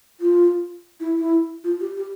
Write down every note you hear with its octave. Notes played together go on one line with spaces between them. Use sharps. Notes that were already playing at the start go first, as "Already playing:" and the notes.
F4
E4
E4
F4
G4
G4